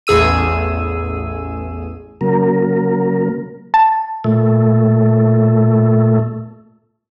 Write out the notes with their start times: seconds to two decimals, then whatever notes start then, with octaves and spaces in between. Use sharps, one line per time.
0.07 A1 E2 G#4 E6 D#7
2.21 C#3 F#3 A#3 A#4
3.74 A5
4.24 A#2 A3